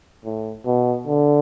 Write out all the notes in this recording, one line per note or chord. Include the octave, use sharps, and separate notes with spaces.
A2
B2
D3